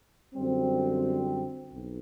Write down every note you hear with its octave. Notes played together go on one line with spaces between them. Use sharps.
F#2 D3 G3 C4
B1